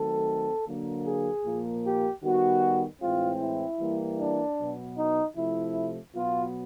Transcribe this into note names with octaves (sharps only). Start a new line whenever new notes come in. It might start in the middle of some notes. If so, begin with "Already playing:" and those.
Already playing: D#3 F#3 A3 C4 A4
D3 F#3 A#3
G#4
A#2 F3 A#3
G4
D#3 G3 B3 F#4
A2 E3 G#3 C4 F4
E4
E3 G3 A#3
D4
B2 F#3 B3
D#4
C3 F3 A3 E4
B2 F#3 B3 F4